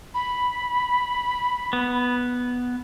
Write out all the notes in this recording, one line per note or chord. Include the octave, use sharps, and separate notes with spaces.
B5
B3